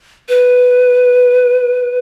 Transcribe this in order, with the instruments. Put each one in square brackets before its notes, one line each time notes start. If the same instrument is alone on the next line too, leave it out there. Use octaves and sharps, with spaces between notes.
[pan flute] B4